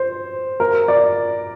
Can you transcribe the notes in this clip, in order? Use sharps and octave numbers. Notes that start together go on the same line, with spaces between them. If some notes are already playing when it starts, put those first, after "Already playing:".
Already playing: C5
A#4
D5